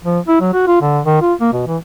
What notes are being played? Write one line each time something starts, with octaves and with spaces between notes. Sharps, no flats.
F3
E4
F#3
F#4
F4
D3
D#3
F4
A#3
B2
E3